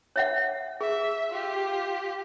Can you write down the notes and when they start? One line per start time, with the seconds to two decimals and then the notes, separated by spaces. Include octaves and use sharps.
0.16 C#5 E5 F#5
0.81 G#4 E5
1.30 F4 G4